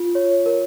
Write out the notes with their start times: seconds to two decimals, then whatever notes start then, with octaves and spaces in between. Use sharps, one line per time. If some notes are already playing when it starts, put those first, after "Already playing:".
Already playing: F4
0.15 C#5
0.46 A#4